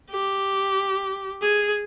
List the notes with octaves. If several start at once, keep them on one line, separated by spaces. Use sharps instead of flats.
G4
G#4